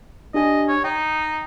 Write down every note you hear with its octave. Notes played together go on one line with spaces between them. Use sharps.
D4 G4 D#5 G#5
C#5
D#4 G5